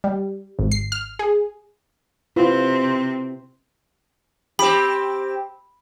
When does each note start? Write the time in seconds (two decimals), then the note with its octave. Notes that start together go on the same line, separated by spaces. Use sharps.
0.04 G3
0.59 G#1
0.71 C7
0.92 F6
1.19 G#4
2.36 C3 C4 E4 F4 B4
4.59 C4 G4 B5